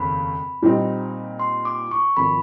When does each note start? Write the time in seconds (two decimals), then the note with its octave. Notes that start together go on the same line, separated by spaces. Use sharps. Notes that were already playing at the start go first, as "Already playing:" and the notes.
Already playing: F1 D#2 C#3 B5
0.62 A#2 G3 C4 D#4
1.39 C6
1.65 D6
1.91 C#6
2.17 G#1 F3 B5